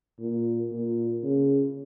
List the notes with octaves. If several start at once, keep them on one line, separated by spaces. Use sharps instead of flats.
A#2
A#2
C#3